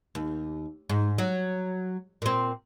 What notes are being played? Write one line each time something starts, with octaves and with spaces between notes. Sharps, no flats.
D#2
G#2
F#3
A#2 C4